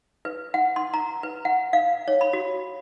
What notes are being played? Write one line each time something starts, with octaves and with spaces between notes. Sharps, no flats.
B4
F#5
C6
A#5
B4
F#5
F5
C#5
B5
F#4